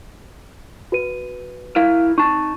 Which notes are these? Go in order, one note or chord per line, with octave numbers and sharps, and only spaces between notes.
F#4 B4 D#7
E4 A#4 F5
D#4 A5 C#6